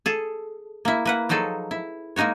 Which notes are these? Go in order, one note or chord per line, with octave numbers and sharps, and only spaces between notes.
G#4 A4
A#3 E4
A#3 B4 F#5
F3 F#3 D#4 G#4 A4
E4
G#3 A#3 D#4 F#4 C#5